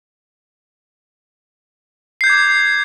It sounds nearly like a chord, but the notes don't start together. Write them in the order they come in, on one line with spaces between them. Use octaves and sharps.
C7 G6 G#6 D6